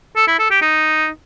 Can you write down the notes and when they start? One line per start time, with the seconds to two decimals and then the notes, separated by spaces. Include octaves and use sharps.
0.16 A4
0.27 E4
0.39 A4
0.50 G4
0.62 D#4